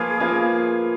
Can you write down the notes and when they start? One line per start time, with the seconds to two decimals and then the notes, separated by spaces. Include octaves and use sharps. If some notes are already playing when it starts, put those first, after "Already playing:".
Already playing: F3 A#3 F4 G#4 B4
0.20 F3 A#3 F4 B4